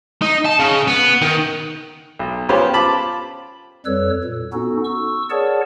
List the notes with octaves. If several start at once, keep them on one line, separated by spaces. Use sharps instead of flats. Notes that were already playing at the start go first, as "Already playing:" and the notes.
D#4
A5
C#3
B3
D#3
B1
B3 C#4 F4 G4 C5
F4 C5 A5 B5 D6
F2 G3 A4 B4 C#5 E6
A#2
B3 C#4 D#4 F#4 A4
C#6 E6
G#4 A#4 C#5 D5 F#5 A5